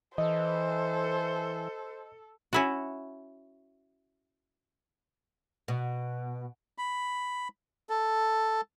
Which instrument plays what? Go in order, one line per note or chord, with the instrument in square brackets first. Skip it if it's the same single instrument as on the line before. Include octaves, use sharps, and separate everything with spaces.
[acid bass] E3 [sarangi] A4 [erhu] C5 [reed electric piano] D#5
[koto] C#4 E4 F#4
[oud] B2
[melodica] B5
A4